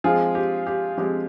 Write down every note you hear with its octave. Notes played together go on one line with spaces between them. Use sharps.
F3 G#3 C4 F4 G#4
G4
G4
F3 G#3 C4 G4